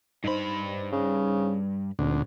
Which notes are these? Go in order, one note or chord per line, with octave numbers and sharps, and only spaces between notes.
G2 D#4 C5 B5
C#3
D#1 D2 A#2